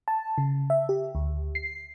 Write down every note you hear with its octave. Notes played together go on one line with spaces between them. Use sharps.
A5
C#3
E5
G4
D2
C7